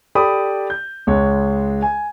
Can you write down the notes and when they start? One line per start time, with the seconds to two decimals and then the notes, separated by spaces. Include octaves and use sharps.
0.15 G4 A4 D5 B5 D#6
0.70 G6
1.07 C#2 G#3 C#5
1.82 G#5